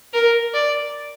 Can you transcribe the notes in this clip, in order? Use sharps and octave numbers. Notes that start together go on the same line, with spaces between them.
A#4
D5